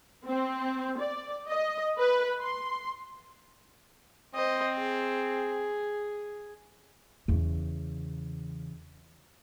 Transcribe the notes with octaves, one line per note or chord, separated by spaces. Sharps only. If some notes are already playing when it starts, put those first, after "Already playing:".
C4
D5
D#5
B4
C6
C4 C5 D#5
G#4
E2 C#3